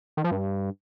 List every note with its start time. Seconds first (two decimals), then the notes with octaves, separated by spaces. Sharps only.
0.17 D#3
0.24 F3
0.31 G2